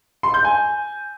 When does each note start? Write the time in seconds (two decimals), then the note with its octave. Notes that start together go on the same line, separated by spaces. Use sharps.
0.23 C6
0.34 G6
0.45 G#5